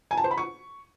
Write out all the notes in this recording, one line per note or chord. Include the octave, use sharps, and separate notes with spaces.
G#5
A5
C5
B5
C#6